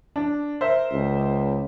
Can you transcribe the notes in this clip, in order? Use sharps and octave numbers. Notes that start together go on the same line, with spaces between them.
D4
A#4 C5 E5
C#2